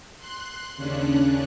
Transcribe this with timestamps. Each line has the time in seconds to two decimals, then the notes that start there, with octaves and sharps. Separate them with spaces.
0.17 C6 F#6
0.76 D#2 C#3 C#4 D4 F#6